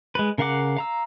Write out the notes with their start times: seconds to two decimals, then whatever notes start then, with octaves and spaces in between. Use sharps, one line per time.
0.15 G#3 B4
0.38 C#3 A#4 F5 F#5 D6
0.77 F5 A#5 E6